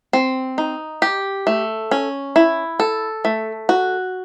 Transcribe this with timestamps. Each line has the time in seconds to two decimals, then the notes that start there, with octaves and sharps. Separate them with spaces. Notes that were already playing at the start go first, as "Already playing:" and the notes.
0.13 C4
0.58 D#4
1.02 G4
1.47 A3
1.91 C#4
2.36 E4
2.80 A4
3.25 A3
3.69 F#4